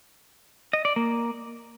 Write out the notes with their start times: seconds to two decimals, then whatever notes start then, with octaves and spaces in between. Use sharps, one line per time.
0.73 D#5
0.85 D5
0.96 A#3